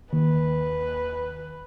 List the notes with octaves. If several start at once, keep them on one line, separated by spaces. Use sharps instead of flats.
D#2 B4